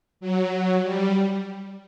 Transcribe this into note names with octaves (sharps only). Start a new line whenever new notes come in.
F#3
G3